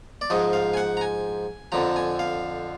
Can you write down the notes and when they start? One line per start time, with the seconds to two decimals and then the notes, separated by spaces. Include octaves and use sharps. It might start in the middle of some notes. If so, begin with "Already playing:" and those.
0.21 D5
0.30 G#2 F3 D#5
0.53 F5
0.74 G#5
0.77 F#5
0.97 A#5
1.01 G#5
1.72 F2 D3 F3 A#5
1.96 G#5
2.19 F5